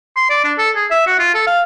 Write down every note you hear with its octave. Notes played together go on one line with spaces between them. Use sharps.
C6
D5
D4
A4
G#4
E5
F#4
F4
A4
F5